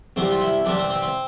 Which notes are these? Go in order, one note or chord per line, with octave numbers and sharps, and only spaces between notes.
C2 C3 G3 C4
F4
E4
C2 C3 G3 D4
C4
C4
C4